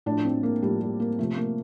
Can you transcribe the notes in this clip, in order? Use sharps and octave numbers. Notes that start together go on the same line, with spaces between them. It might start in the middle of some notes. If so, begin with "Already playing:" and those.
A2 F3 D4
C4
A#3
A2 F3 G3
G3
A#3
C3 F3 A3
A#3